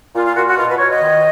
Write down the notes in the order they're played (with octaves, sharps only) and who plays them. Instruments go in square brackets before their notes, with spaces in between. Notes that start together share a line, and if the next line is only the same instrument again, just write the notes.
[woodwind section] A#2 F4
F4
A#2 F#4
F#4
B2 F4
B4
B2 C#5
D#5
D#3